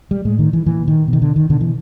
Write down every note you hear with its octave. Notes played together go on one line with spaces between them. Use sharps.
G3
A2 G#3
D#3
E3
A#2 E3
D#3
B2
D#3
D3
D#3
B2 D3
E3